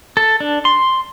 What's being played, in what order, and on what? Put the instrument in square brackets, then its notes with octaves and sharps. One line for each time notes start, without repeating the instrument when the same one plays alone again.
[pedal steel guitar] A4
D4
C6